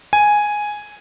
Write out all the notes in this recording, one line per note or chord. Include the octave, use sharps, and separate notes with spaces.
G#5